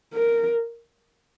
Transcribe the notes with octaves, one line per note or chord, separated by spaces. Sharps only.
A#4